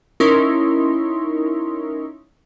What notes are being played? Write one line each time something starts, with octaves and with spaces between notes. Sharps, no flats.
C#4 D#4 E4 A#4 C6